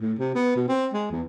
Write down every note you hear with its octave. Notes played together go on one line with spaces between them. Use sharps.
A2
C3
B3
B2
C4
G#3
E2